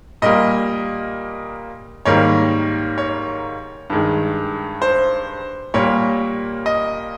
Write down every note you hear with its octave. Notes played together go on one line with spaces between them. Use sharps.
A#2 G3 A#3 D#5
G#2 D#3 G3 A#3 C#5
C#5
G2 D#3 G#3
C5
A#2 G3 A#3 C#5
D#5